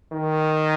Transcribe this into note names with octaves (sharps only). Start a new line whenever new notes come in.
D#3